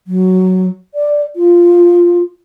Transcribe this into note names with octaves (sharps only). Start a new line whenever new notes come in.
F#3
D5
F4